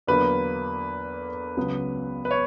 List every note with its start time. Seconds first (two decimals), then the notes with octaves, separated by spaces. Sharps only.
0.07 E2 D3 F#3 A#3 B4
1.57 C#2 C#3 F#3 B3
2.25 B4
2.31 C#5